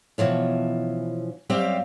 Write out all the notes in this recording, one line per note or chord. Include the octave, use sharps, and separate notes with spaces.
B2 E3 F3 C#4
F#2 G3 C4 G4 F5